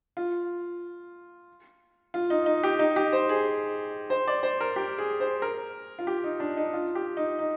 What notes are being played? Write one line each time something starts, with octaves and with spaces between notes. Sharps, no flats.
F4
F4
D#4
D#4
G4
D#4
G4
C5
G#4
C5
D5
C5
A#4
G4
G#4
C5
A#4
F4
G4
D#4
D4
D#4
F4
G4
D#4
D#4